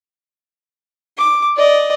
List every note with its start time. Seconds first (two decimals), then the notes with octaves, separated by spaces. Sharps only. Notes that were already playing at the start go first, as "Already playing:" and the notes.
1.18 D6
1.56 D5 D#5